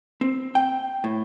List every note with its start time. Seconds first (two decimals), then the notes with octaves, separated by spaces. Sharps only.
0.21 C4
0.55 G5
1.04 A2